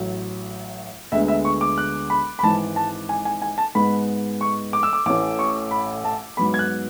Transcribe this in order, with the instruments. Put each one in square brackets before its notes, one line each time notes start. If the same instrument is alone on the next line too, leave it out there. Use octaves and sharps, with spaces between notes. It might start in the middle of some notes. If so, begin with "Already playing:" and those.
Already playing: [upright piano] A1 A2 F#3
D2 D3 G#3 B3 E5
E5
C#6
D6
F#6
B5
B5
G#1 G#2 E3 A5
A5
G#5
G#5
G#5
A5
G#2 G#3 B3 B5
C#6
D6
E6
D6
A1 A2 E3 A3 C#4 D6
C#6
B5
A5
G#2 F#3 B3 B5
G#6
F#6